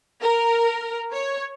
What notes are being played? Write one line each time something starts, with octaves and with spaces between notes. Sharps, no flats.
A#4
C#5